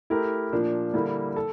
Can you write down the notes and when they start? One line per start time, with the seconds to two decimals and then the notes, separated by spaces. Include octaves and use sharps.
0.10 A3 E4 G4 A#4
0.52 A#2 F3 A#3 D4
0.93 D3 G3 A#3 E4
1.36 A4